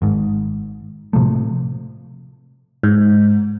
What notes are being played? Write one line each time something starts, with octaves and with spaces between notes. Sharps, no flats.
G#1 G#2
A2 C3 F3 A3
G#2